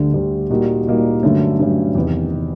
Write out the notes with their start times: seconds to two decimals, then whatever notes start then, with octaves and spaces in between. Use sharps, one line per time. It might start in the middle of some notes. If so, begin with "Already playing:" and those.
Already playing: D2 D3 G3
0.14 D2 D3 G3
0.50 A#2 G3 A#3 D#4 F#4
0.87 A#2 G3 A#3 D#4 F#4
1.23 G2 D3 F#3 A3 C#4
1.59 G2 D3 F#3 A3 C#4
1.95 E2 C3 D#3
2.32 C3 D#3